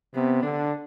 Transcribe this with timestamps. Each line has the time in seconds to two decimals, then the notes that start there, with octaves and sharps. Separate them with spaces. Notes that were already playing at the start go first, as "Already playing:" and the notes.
0.14 C3 B3
0.43 D3 D4